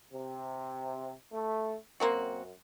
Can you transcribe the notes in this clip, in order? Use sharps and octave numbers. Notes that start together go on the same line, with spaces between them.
C3
A3
F#2 A#3 C4 F#4